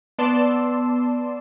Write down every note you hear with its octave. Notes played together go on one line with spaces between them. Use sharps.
B3 D5 A5 C6 E6